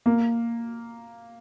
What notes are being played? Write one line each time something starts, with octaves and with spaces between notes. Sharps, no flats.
A#3